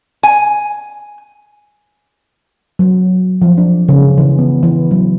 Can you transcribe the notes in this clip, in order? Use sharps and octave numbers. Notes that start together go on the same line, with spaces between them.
G#5
F#3
F3
D4
C#3
E3
B3
E3
F#3